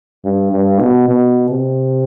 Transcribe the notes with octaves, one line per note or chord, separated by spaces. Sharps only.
G2
G2
B2
B2
C3